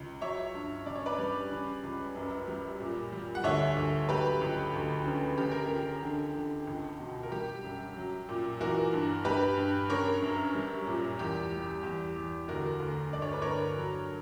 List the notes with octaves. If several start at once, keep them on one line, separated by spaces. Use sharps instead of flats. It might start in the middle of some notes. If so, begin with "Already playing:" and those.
Already playing: C#2
F#3 C#5 E5
G2
C#3 D5
C#5
B4 D5
G3
C#3
C#2
F#2
G3
A#2
G3
F#5
D2 C#5 E5
D2
F#3 G4 B4
C#2
D2
C#3
C#3 G4
A#4
C#2 G4
D3
D3
C#2
B2
A#4
G3 G4
F#2
F#3
A#2
E3 F#4 A#4
G2
G2 G4 B4
G2
C#3 A#4 C#5
F#2
G3
A#2
E2 G4
G3
E2 G4
E2
D2 F#4 A#4
D2
G2 D5
C#5
B4
G2 A#4 C#5
F#3